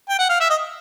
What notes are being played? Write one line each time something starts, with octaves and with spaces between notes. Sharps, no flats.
G5
F#5
F5
E5
D#5